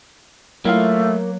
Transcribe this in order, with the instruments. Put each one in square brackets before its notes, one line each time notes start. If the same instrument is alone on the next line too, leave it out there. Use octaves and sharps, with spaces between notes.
[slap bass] F#3 [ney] A3 [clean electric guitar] A#3 [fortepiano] E4 F4 F5